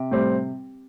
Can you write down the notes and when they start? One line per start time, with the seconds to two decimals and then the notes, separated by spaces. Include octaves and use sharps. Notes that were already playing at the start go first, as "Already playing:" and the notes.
Already playing: C3
0.11 A2 G3 C4